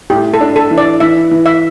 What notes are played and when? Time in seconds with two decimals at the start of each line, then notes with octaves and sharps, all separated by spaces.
0.10 A2 G4
0.34 A4
0.41 D4
0.56 A4
0.71 E3
0.78 D5
1.00 E3 E5
1.31 E3
1.46 E5